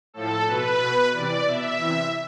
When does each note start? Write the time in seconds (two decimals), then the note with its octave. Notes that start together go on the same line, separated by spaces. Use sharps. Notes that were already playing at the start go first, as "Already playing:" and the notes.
0.14 A2 F3 A4
0.46 B2 B4
0.79 B2
1.12 C3 E3 D5
1.45 B2 E5
1.78 C3 E3